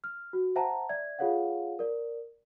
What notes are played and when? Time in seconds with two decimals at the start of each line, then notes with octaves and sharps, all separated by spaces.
0.04 F6
0.33 F#4
0.56 C5 E5 F#5 G5 A5 A#5
0.89 D5 E5 G#6
1.19 F4 G#4 A4 C#5 F5 F#5
1.79 A#4 D5